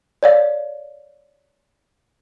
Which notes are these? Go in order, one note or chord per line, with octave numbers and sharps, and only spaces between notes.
C#5 D5 F5